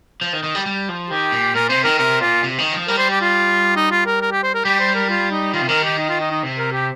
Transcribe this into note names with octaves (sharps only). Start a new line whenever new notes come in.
F3
D#3
D#3
G3
G3
F3
D#3 G4
A#2
A#2 A#4
C3 C5
D#3 A#4
C3 A#4
A#2 F4
C3
D#3
F3
G3 A#4
C5
G4
F4
D#4
F4
A#4
A#4
G4
C5
A#4
G3 G4
C5
A#4
F4
D#4
D#3 F4
C3
D#3 A#4
G4
D#4
F4
D#4
D#4
C3
A#4
G4